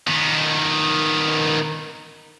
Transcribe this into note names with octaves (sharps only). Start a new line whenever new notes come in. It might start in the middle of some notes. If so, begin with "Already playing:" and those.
D#3 B3